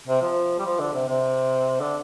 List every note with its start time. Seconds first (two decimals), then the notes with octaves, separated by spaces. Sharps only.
0.07 C3
0.22 F3
0.59 G3
0.65 F3
0.79 D3
0.93 C3
1.08 C3
1.80 D3